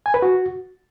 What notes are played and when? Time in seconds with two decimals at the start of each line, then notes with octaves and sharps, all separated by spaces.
0.06 G#5
0.14 B4
0.22 F#4